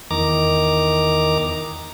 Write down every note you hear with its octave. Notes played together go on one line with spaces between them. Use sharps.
E2 D#3 A#5 D6